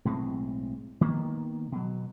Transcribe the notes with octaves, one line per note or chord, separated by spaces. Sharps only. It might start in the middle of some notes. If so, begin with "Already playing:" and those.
B1 A2 G#3 C4
D#3 A#3 B3
B2 F#3